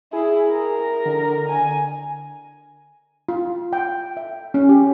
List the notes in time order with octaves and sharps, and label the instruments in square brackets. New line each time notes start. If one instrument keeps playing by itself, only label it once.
[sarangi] E4 [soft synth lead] G#4
[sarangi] A#4
[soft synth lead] D3
[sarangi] G#5
[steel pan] F4
G5
E5
C#4
G4